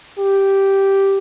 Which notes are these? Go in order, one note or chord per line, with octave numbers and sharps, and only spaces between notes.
G4